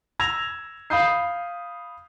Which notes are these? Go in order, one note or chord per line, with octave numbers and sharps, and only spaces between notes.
E6 G#6 A#6 F7
F5 B5 D#6 G6 C7